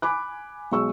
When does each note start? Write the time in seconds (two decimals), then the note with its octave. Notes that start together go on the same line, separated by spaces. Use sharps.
0.02 G#5 B5 D6 F#6
0.72 B1 G#3 C#6 E6